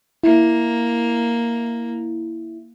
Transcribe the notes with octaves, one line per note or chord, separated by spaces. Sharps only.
A#3 E4